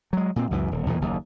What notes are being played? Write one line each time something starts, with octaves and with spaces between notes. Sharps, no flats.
F#3 G#3
A#2 C4
C#2 F#2 E3
D#1
B1 E2 A#2 E3
F#1 D#2